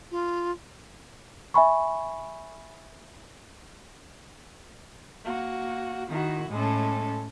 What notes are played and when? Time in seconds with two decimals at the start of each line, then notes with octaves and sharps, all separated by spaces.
0.11 F4
1.54 E5 G#5 B5 C#6
5.24 A#3 F#4
6.10 D#3 E4 F#4
6.50 A2 G#3 C#4 A4